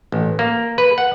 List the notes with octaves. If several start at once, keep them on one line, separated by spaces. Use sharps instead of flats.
A1
A#3
B4
F#5